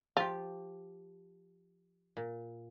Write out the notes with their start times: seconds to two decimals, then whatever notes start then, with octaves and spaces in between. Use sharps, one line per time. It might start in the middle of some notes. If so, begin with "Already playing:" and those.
0.17 F3 F4 G4
2.17 A#2